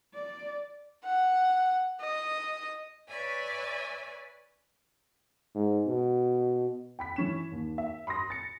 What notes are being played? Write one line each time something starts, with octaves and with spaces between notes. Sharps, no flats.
D5
F#5
D#5
B4 C#5 D5 E5 G#5
G#2
B2
G5 B5 B6
E3 C#4 E7
D#2
E5
B5 C6 D#6 A#6
A6 C#7